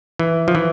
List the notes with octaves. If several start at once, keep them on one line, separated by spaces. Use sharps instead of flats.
E3
F3
E3